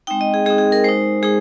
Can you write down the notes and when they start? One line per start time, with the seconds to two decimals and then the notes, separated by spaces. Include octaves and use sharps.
0.07 G#3 C4 D#4 G5
0.21 D#5
0.34 G#4
0.46 G#3 C4 D#4 G#4
0.58 G#4
0.72 A#4
0.84 G#3 D#4 C5
1.22 G#3 D#4 G#4